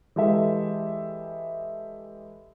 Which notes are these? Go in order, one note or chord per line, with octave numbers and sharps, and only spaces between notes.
E3 G#3 G4 A4 E5